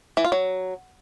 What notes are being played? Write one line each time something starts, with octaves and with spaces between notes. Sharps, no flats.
E3
F4
F#3